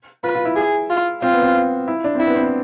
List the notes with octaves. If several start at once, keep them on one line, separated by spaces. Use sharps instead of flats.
F4 B4
F4
E4
G#4
F4
C4 F4
B3
C4
E4
D4
C4 E4
B3
C4